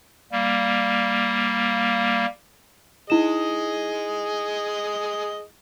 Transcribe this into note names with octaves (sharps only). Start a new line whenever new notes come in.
G3 A#3
D#4 E4 G#4 D#5 E7